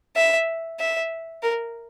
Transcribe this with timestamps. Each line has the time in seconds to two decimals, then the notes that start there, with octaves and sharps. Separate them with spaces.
0.16 E5
0.80 E5
1.43 A#4